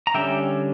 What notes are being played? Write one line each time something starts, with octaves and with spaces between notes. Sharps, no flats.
A#5
D3 G3 C#4 E5 G5